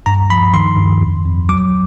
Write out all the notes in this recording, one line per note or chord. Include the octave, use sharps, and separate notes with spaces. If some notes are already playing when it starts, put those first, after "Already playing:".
G2 A#5
F3 B5
D#3 C6
G2
F2
F2
F#3 D6